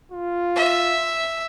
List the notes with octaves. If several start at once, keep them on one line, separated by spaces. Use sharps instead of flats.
F4
E5